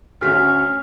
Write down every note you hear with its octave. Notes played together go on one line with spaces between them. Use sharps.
D2 C#4 F#4 F6 B6